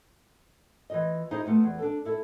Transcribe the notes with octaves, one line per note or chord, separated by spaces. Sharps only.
E3 F4 D#5
D#4 E4 G#4 C5
A3 B3 F4
E2
D4 A4
E4 A4